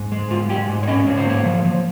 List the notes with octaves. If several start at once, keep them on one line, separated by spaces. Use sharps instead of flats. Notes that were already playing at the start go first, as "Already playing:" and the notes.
Already playing: G#2
G#3
G#2 F4
G#3 G4
G#2
C#5
C#4 D#5
G#2 C#5
C5
A#3 C#5
F3
F3